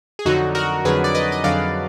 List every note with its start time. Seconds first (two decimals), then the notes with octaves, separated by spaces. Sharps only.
0.19 G#4
0.25 F2 D3 F#3 D#4 F#4
0.55 F#4 A#4
0.85 F2 D3 F#3 G#4 B4
1.04 D5
1.15 B4 D#5
1.32 D#5
1.44 F2 D3 F#3 D5 F5